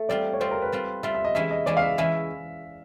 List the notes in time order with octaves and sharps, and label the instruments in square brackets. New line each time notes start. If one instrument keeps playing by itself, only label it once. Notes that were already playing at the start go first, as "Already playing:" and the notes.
Already playing: [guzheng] A3
[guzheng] G3 C4 F4 [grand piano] D5
[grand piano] C#5
[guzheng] G3 C4 F4 [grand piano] C5
[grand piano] A#4
B4
[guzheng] G3 C4 F4
[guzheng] G3 C4 F4 [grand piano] E5
[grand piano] E5
D#5
[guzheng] E3 G#3 C#4 E4 [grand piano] E5
[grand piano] D#5
[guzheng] E3 G#3 C#4 E4 [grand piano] D5
[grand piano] F5
E5
[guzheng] E3 G#3 C#4 E4 [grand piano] E5